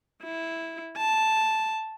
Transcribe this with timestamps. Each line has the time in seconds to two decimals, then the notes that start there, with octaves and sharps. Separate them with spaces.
0.24 E4
0.97 A5